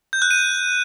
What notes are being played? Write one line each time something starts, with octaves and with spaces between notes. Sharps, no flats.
G6
F#6
D#7